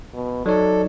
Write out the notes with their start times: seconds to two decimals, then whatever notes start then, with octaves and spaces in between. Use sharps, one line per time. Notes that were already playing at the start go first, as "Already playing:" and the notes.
0.14 B2
0.46 F#3 D#4 A4 C#5 D5